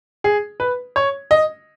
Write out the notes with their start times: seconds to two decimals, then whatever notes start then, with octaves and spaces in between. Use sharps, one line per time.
0.24 G#4
0.60 B4
0.96 C#5
1.31 D#5